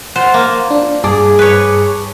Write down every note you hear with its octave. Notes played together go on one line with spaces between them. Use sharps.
F3 C5 F#5
A#3
D4
G2 G#4 A5 D6
B4 C#5